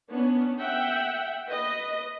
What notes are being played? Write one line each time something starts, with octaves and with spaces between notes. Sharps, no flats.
B3 C#4 D4
E5 F#5 G5
B4 D#5